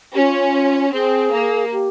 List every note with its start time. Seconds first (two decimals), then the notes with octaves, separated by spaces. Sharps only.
0.14 C#4 G4
0.19 F4
0.93 C4 G#4
1.33 A#3
1.72 G4